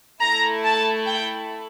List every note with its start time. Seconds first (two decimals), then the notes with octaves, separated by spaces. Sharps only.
0.21 A3 E4 A4 A#5
0.64 A5
1.06 G5